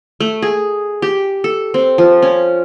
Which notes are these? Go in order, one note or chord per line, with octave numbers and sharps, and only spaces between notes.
A3
G#4
G4
A4
C4
F3
C#4